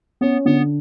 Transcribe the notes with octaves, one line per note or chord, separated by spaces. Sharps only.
B3 C#4
D3 B3